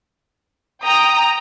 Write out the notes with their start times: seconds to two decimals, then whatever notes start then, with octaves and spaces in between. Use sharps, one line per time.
0.83 G5 A#5 D#6